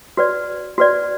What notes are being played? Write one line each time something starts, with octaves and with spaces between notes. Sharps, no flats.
F#4 B4 D5
F#4 B4 D5